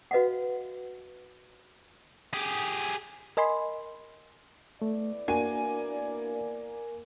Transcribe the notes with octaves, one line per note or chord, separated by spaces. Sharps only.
F#4 B4 D#5 F5 F#5
G4 G#4
A#4 D#5 G#5 B5 C6
A3 B3 E4 D5
A#3 D4 F#4 G#5 D#7